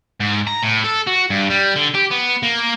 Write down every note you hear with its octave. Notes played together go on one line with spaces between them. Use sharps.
G#2
A#5
A2
A4
F#4
G2
G3
D3
G4
B3
A#3